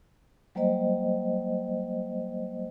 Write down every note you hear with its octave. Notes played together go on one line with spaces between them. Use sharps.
F#3 G3 A#3 C5 D#5